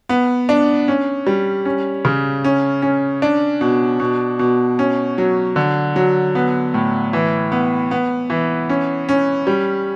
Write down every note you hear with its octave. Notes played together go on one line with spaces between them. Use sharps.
B3
D4
C#4
G3
C#4
C#3
C#4
C#4
D4
B2
B2
B2
C#4
F#3
D3
F#3
B3
A2
E3
B3
B3
E3
C#4
C#4
G3